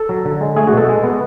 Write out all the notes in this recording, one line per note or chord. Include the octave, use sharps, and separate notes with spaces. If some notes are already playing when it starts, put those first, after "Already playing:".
Already playing: A4
F#3
D3
G#3
A3 G#4
F#4
B2 A4
G#3
B3